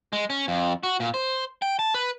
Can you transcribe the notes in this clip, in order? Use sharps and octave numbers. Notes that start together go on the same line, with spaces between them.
G#3
C#4
F2
F#4
A#2
C5
G5
A5
B4